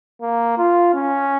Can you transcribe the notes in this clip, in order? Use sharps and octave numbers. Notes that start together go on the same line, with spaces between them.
A#3
F4
C#4